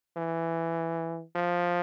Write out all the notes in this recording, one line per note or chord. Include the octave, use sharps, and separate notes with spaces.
E3
F3